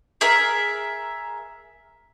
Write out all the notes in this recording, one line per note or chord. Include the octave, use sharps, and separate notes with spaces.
G#4 A#4 E5